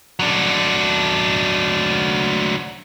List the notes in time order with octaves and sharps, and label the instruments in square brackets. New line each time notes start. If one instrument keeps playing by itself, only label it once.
[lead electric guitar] F#3 D4